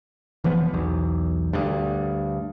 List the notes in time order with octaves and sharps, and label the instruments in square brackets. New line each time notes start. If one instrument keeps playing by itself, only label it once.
[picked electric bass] F1 E3 F3 B3
B1 E2
D2 G2